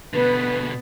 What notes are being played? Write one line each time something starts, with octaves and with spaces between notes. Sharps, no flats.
B2 D3 B3 B4